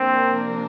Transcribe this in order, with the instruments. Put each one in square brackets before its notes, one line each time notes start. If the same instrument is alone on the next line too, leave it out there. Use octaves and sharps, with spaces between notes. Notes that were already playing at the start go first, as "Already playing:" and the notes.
Already playing: [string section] C3 F3 A#3 D4 A#4 [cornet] C4